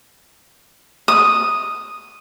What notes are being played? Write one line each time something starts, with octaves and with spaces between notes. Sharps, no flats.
D#6